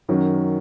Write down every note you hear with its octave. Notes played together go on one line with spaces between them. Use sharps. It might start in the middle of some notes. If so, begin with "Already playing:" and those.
F#2 D#3 F#3